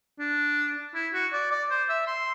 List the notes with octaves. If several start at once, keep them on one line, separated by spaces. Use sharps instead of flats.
D4
E4
F#4
D5
D5
C5
E5
C6